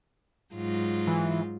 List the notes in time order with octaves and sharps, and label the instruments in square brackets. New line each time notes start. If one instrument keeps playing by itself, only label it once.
[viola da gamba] G#2 F#3 F4
[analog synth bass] E3